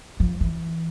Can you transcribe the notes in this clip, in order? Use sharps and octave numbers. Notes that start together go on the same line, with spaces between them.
F3
E3